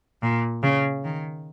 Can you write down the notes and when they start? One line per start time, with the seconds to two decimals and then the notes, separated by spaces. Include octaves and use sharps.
0.22 A#2
0.63 C#3
1.04 D#3